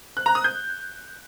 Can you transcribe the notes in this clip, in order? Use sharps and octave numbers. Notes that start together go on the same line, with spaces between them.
F#6
A#5
D#6
G6